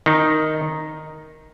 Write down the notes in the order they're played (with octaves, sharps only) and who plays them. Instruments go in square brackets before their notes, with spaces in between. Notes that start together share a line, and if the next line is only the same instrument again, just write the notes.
[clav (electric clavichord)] D#3 D#4